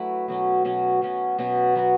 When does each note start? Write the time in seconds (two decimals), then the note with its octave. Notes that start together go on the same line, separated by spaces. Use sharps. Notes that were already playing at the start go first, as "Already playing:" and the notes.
Already playing: F#3 A3 E4 B4
0.28 B2 F#3 C#4
0.65 B2 F#3 C#4
1.01 B2 F#3 C#4
1.38 B2 F#3 C#4
1.76 F#3 B3 F#4